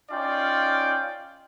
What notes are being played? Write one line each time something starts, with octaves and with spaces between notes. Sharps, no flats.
C#4 D#4 F4 D5 F5 G5